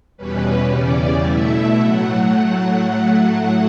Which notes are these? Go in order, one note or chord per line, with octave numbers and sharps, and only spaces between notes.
E2 B2 G3 C#4 B4
E2 C#3 G3 C#4 D5
B2 A3 E4 E5
A2 F#3 A3 F#5